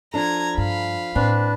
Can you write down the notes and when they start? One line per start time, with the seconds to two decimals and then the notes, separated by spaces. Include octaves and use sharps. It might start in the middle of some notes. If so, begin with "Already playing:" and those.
0.14 F3 D4 A4 A#5 G#6
0.58 G2 F5 B5
1.15 A2 C4 D4 B4